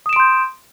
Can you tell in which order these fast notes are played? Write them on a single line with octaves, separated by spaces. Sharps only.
D#6 E7 D7 C6 G6